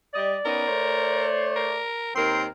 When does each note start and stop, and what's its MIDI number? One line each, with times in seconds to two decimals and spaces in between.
0.14 0.35 55
0.14 1.85 74
0.14 0.35 75
0.45 0.67 59
0.45 0.67 61
0.45 0.67 63
0.45 1.28 70
0.67 1.77 57
0.67 1.77 72
0.67 1.77 73
1.56 2.15 70
2.16 2.46 39
2.16 2.46 60
2.16 2.46 70
2.16 2.43 84